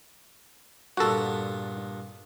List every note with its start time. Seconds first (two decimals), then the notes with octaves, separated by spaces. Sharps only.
0.97 G2 A#2 B3 F#4 A4